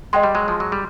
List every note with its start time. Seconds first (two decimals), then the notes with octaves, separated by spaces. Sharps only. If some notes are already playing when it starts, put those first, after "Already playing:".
0.13 G#3 D#5 G5 C6
0.23 G3
0.35 F#3 G#3
0.48 F3
0.60 F#3
0.72 G3